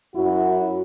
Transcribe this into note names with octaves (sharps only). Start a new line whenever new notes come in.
F#2 E4 F#4